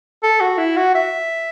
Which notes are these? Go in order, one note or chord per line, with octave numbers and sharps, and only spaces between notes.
A4
F#4
E4
F#4
E5